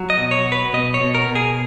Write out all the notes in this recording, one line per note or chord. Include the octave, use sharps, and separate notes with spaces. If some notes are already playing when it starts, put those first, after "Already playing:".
Already playing: F#3
D#5
B2
C#5
F#3
B4
B2 D#5
C#5
B2
A#4
B2
G#4